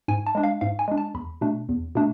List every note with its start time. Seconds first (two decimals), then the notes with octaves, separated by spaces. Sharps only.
0.08 G#2 G#5
0.27 A5
0.35 G#3 D4
0.43 F5
0.61 G#2 F5
0.79 G#5
0.88 G#3 D4
0.98 A5
1.14 E2 B5
1.41 B2 A3 D4
1.69 E2
1.95 B2 A3 D4